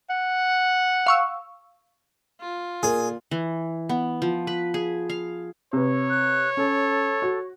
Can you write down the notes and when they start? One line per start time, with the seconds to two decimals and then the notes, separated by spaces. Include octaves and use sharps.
0.10 F#5
1.07 F5 C#6 E6
2.40 F4
2.83 A#2 G#4 A#4
3.31 E3
3.89 B3
4.22 F3
4.47 B4
4.74 G#4
5.10 F5
5.73 C3 B4 C#5
6.09 F#6
6.57 C#4 A4
7.22 F#4